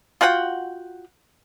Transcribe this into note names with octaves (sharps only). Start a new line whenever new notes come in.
F4 F#4 F#5 G5